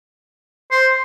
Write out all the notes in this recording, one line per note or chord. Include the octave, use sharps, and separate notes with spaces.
C5